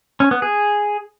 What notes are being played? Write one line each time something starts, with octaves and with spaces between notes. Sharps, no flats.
C#4
B3
G#4